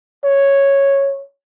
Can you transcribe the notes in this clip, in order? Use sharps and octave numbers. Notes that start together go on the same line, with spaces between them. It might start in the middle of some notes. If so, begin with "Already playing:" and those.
C#5